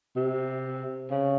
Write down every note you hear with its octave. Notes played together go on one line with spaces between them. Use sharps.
C3
C#3